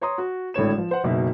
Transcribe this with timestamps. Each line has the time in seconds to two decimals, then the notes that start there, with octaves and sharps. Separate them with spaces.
0.01 C#5 A#5 C6 D#6
0.18 F#4
0.54 G#1 A2 D3 C#5 E7
0.78 F3
0.91 C5 F#5
1.04 F#1 B2 D#4 E5